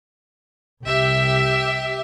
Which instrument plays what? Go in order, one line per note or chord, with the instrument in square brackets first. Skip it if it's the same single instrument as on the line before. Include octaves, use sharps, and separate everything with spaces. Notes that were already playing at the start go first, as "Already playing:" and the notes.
[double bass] C2 [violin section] G4 E5